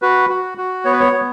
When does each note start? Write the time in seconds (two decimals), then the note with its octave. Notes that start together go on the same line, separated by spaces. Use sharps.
0.02 F#4 B4
0.30 F#4
0.58 F#4
0.85 B3 C#5
0.93 B4
1.00 C#5
1.13 B3